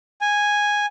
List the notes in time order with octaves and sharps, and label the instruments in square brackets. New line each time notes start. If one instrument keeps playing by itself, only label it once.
[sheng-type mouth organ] G#5